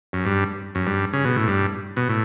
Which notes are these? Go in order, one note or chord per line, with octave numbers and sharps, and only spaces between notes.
F#2
G2
F#2
G2
C#3
B2
A2
G2
B2
A2